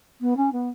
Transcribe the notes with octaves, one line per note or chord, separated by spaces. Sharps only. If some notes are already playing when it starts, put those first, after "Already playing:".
B3
C#4
B3